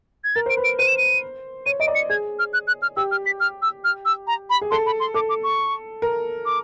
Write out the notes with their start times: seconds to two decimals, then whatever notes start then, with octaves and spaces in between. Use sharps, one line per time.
0.24 G#6
0.35 A#4 A6
0.46 C5 D7
0.57 B4
0.64 D7
0.79 C5 D#7
0.88 E7
0.98 D#7
1.66 C#5 D#7
1.80 D#5 D7
1.88 D5
1.95 C#7
2.09 G#4 G#6
2.39 F6
2.53 F#6
2.67 F#6
2.82 F6
2.97 G4 E6
3.11 F6
3.26 B6
3.40 F6
3.62 E6
3.84 F6
4.05 E6
4.27 A#5
4.50 B5
4.61 G#4
4.71 A4 C6
4.86 B5
5.00 C6
5.14 A4 D6
5.29 D6
5.43 C#6
6.02 A#4
6.46 D6